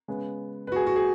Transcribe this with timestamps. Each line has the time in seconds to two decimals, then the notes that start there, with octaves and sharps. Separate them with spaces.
0.08 C#3 G#3 B3
0.67 B4
0.72 F#4
0.76 G#4
0.86 F#4
0.96 G#4